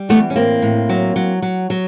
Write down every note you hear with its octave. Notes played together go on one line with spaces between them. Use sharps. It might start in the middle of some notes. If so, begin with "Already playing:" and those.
Already playing: G3
E3 A3 B3
C#4
A2 A#3 C4
A2
F#3
F#3
F#3
F#3